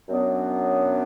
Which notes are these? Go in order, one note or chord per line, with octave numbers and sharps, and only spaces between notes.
F#2 F#3 B3 D4